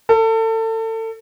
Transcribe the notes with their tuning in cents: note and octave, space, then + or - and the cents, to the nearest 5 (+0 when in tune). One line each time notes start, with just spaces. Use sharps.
A4 +30